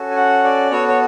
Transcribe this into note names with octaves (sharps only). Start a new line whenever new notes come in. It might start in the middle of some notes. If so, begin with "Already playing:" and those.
Already playing: C#4 F#4 A4
G#5
F#5
D5
B3 F#4 A4 C#5
C#5